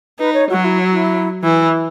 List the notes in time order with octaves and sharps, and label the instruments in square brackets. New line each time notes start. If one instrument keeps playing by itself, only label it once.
[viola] D#4 [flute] B4
[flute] C#5
[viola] F#3 [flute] F#4
[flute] E4
E4
[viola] E3 [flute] E4